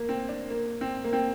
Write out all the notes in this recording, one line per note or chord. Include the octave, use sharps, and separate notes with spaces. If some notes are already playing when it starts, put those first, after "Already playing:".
Already playing: A#3
C4
D4
A#3
C4
A#3
C4